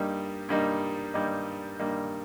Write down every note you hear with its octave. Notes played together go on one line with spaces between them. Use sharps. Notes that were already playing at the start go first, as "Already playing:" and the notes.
Already playing: G2 G3 A#3 D#4
G2 G3 A#3 D#4
G2 G3 A#3 D#4
G2 G3 A#3 D#4